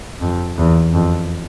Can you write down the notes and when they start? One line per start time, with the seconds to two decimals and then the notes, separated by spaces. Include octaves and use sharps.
0.21 F2
0.58 E2
0.94 F2